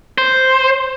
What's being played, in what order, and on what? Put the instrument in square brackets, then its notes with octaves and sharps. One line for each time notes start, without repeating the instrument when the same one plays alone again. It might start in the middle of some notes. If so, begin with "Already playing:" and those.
[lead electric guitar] C5